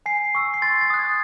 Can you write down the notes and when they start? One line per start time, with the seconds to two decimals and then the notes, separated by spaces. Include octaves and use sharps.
0.06 G#5 C7
0.35 C#6 E6
0.54 C7
0.62 C6 A6
0.81 A6
0.90 D#6 F#6
0.99 G#6